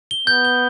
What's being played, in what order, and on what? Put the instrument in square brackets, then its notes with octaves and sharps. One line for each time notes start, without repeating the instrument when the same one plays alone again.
[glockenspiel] G7
[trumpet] B3 [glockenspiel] G6
[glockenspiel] G7